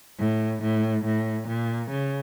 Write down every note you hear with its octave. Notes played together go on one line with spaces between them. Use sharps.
A2
A2
A2
A#2
C#3